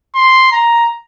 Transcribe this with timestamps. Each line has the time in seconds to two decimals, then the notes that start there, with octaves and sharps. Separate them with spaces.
0.15 C6
0.52 A#5